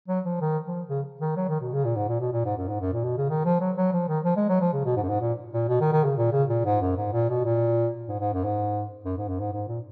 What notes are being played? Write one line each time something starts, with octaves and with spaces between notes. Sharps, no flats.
F#3
F3
D#3
F3
C#3
D#3
F#3
D#3
B2
C#3
A#2
G#2
A#2
B2
A#2
G#2
F#2
G#2
F#2
A#2
B2
C#3
D#3
F3
F#3
F#3
F3
D#3
F3
G#3
F#3
F3
C#3
B2
G#2
F#2
G#2
A#2
A#2
B2
D#3
D#3
C#3
A#2
C#3
A#2
G#2
F#2
G#2
A#2
B2
A#2
G#2
G#2
F#2
G#2
F#2
G#2
F#2
G#2
G#2
A#2